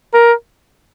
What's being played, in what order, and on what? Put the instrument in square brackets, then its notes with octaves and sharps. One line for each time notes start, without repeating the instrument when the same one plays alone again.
[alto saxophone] A#4